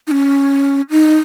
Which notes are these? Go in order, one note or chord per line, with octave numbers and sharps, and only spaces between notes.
D#4
C#4
D#4